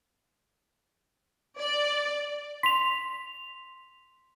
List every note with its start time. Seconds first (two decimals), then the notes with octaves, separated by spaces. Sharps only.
1.59 D5
2.63 C6 B6 F7